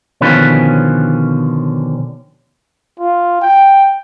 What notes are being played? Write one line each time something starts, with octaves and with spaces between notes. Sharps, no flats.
B2 D3 D#3 F3 C#4 B4
F4
G5